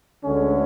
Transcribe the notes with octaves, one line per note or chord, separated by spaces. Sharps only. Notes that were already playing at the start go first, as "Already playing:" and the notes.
D2 D3 G#3 C#4 G#4